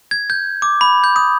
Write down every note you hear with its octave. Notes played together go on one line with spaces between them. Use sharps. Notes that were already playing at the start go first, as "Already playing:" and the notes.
G#6
G6
D6
B5
G6
D#6